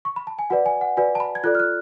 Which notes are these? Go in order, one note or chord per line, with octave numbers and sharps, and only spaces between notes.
C#6
B5
A5
G#5
F#4 B4 D5 F#5
G#5
F#5
F#4 B4 D5 G#5
A5
B5
G#6
F4 A4 D5 F#6
F6
F#6